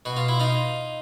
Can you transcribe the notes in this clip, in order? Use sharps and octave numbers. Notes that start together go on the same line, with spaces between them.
B2 F#4
F4
E4
D#4 F4